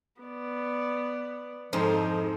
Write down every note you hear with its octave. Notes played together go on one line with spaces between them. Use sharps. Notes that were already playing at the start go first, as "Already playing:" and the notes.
B3 D5
F2 G#2 F3